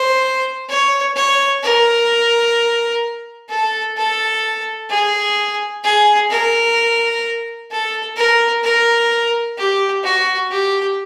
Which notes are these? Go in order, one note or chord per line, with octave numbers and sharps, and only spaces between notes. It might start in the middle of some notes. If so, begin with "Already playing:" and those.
Already playing: C5
C#5
C#5
A#4
A4
A4
G#4
G#4
A#4
A4
A#4
A#4
G4
F#4
G4